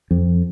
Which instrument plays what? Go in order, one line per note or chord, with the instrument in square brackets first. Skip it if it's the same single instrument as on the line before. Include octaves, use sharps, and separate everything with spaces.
[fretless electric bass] F2